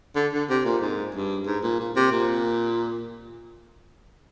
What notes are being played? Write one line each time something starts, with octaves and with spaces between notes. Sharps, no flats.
D3
D3
C3
A#2
G#2
G2
G#2
A#2
A#2
C3
A#2